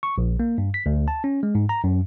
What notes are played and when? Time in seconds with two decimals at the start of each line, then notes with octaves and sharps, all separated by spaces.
0.03 C#6
0.18 A#1
0.40 A#3
0.58 G2
0.74 B6
0.86 D2
1.08 A5
1.24 C#4
1.43 G#3
1.55 G#2
1.69 A#5
1.84 F#2